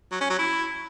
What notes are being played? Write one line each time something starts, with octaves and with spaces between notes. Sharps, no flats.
F#3
C#4
F#3
E4